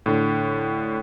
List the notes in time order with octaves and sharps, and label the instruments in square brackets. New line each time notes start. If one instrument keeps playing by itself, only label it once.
[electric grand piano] A2 D3